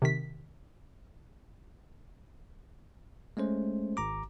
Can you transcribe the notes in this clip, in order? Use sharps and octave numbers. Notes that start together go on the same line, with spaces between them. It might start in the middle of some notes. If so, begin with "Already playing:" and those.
C3 D#3 B6
G#3 A3 C#4 C5
G#1 A#5 D6